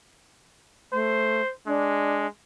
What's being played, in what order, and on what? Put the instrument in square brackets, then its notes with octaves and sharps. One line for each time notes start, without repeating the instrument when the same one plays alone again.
[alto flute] A3 [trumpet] C5
[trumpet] G#3 [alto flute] D4